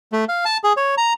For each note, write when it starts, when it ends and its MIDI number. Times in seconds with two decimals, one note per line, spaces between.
0.12 0.25 57
0.29 0.45 77
0.45 0.57 81
0.64 0.73 68
0.77 0.95 73
0.97 1.13 82